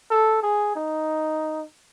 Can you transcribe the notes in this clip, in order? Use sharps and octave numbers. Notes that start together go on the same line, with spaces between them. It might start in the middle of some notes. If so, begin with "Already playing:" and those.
A4
G#4
D#4